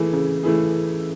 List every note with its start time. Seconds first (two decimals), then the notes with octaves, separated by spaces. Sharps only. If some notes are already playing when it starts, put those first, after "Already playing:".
Already playing: E3 A3 E4 G#4
0.13 C#3
0.43 E3 A3 E4 G#4